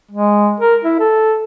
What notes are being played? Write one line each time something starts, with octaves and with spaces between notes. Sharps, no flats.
G#3
A#4
E4
A4